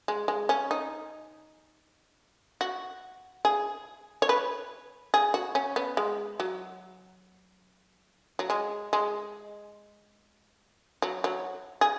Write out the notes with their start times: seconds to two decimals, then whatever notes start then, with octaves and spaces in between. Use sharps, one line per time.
0.08 G#3
0.28 G#3
0.49 C#4
0.71 D#4
2.61 F#4
3.45 G#4
4.22 C#5
4.29 B4
5.14 G#4
5.34 F#4
5.55 C#4
5.76 B3
5.97 G#3
6.40 F#3
8.39 F#3
8.50 G#3
8.93 G#3
11.02 F#3
11.24 F#3
11.81 G#4